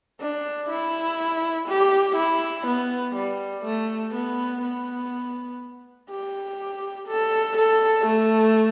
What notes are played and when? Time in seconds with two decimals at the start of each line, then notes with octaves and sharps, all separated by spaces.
0.20 D4
0.69 E4
1.68 G4
2.16 E4
2.66 B3
3.15 G3
3.65 A3
4.14 B3
4.62 B3
6.10 G4
7.08 A4
7.57 A4
8.06 A3